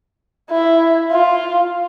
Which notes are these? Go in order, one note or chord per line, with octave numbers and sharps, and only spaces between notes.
E4
F4